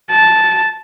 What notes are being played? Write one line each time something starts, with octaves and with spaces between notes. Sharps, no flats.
A5